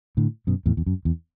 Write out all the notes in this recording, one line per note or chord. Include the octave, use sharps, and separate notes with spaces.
A2 D3
F#2 B2
E2 A2
E2
F#2
E2